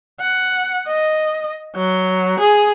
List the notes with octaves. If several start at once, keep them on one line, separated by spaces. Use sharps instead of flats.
F#5
D#5
F#3
G#4